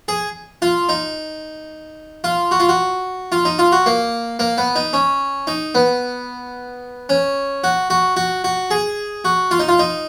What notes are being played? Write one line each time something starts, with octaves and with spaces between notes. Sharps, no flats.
G#4
F4
D#4
F4
F#4
F4
F#4
F4
D#4
F4
F#4
A#3
A#3
B3
D#4
C#4
D#4
B3
C#4
F#4
F#4
F#4
F#4
G#4
F#4
F4
D#4
F4
D#4